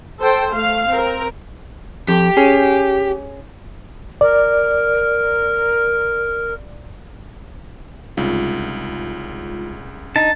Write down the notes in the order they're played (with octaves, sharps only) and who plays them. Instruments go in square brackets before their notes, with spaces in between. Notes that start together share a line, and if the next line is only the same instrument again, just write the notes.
[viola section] A4 C5 G5
A3 F5
C4 A#4
[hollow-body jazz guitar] F2 [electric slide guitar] G4
[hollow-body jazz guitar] C#4 G#4
[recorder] A#4 [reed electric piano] D5
[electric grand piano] C2 C#3 [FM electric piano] G#3 D#4 F4
[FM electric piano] D4 [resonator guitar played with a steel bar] D#4 [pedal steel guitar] A5